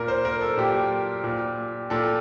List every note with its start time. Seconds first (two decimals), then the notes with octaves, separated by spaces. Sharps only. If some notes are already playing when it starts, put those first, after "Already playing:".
Already playing: A#2 A#4
0.08 C5
0.25 A#4
0.41 A4
0.57 A#2 G4
1.24 A#2
1.90 A#2 A4